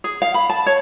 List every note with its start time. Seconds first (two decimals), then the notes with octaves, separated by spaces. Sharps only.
0.04 G#4
0.22 F5
0.34 B5
0.49 A5
0.66 C#5